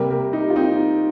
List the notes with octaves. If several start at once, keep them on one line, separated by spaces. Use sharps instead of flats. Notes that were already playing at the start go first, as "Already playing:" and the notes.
Already playing: C3 G3 A#3 G4 A#4
G4 A#4
D#4 G4
F4
C4 D#4